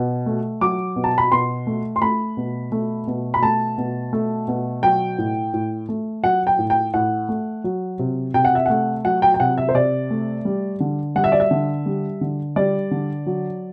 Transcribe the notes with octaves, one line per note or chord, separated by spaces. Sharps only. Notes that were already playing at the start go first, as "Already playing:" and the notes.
Already playing: B2
A3
F#3 D6
B2
A5
B5
B2 C6
A3
C6
A3 B5
B2
A3
B2
B5
A3 A5
B2
A3
B2
F#3 G5
A2
A2
A3
F#3 F#5
G5
A2
G5
A2 F#5
A3
F#3
C3
C3 G5
F#5
E5
A3 F#5
F#3 F#5
G5
G5
C3 F#5
E5
C5
C3 D5
A3
G3
D3
G3 F#5
E5
D5
E5
D3
G3
D3
G3 D5
D3
F#3